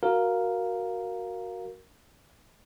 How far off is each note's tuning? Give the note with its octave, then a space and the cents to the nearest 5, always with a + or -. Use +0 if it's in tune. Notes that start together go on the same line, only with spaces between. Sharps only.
F#4 +0 A#4 +0 F5 +0